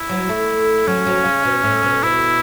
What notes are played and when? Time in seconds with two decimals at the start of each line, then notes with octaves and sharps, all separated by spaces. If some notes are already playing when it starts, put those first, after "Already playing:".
Already playing: E4
0.09 F#3
0.29 A3
0.87 F#3 C#4
1.07 F#3
1.25 C#3
1.45 B2
1.63 A2
1.83 B2
2.03 B2 E4